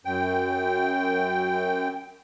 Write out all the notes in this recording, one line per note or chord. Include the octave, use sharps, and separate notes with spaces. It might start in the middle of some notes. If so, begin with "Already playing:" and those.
F#2 G5